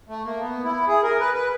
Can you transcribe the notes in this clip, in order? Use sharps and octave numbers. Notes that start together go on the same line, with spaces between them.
A3
A#3
B3
E4
G#4
A#4
B4
B4